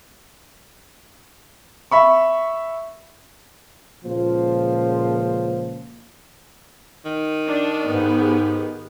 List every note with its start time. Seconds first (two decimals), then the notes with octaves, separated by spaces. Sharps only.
1.92 E5 B5 C#6
4.05 C#2 A#2 C#3 F3 F4 C5
7.05 D#3
7.46 D4
7.87 G#2 B3 G4 G#4